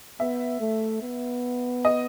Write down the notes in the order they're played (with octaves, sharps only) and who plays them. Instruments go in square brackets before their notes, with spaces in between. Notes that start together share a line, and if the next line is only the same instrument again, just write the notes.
[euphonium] B3 [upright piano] E5
[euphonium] A3
B3
[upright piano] D#5